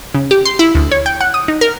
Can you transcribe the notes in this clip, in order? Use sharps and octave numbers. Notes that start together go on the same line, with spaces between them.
C#3
G4
C6
E4
D2
C#5
G5
F#5
D#6
D#4
A#4